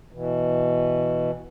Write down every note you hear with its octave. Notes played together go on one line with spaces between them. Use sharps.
B2 E3